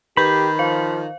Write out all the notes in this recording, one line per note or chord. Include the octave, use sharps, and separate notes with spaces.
D#3 G4 B4 B5 G6
F3 C5 F5